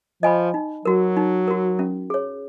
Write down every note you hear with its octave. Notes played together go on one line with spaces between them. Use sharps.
F3 D#5 G#5 B5
D#4
F#3 F#4 A#4
D#4
F#4 A#4
C#4
G#4 C#5